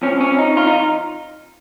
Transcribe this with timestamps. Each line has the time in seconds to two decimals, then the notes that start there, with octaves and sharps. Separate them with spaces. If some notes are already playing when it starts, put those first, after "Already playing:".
0.02 F2 F3 C#4
0.21 C#4
0.38 D#4
0.57 F4
0.67 D#4